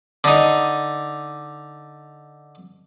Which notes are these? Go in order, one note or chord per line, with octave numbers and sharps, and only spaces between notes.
D3 D#4